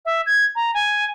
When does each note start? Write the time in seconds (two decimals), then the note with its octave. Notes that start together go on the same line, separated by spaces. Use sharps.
0.05 E5
0.26 G#6
0.56 A#5
0.74 G#5